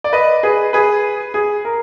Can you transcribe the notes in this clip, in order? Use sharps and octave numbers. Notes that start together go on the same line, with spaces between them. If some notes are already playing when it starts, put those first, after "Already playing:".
D5
B4 D#5
G#4 B4
G#4 B4
G#4
A#4